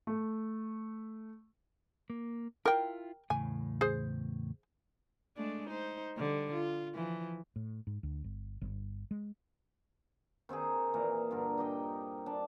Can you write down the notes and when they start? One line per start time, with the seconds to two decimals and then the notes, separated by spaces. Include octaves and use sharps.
0.07 A3
2.10 A#3
2.66 E4 F4 A#4 G5
3.30 E2 A2 C#3 G#5
3.81 G#4 C5
5.36 G#3 A3 D4
5.67 D#4 C5
6.17 D3 G3
6.53 F4
6.94 E3 F3
7.56 A2
7.87 G#2
8.03 D2
8.24 G1
8.61 G1
9.11 G#3
10.49 D#3 C4 D#4 G#4
10.94 A#2 E3 A#5
11.31 G2 D3 A#4
11.58 D#4 G4 D#5 G5
12.26 D4 A5